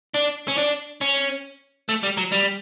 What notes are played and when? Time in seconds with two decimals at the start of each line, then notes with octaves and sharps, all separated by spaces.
0.14 D4
0.48 C#4
0.58 D4
1.01 C#4
1.89 A3
2.03 G3
2.17 F#3
2.32 G3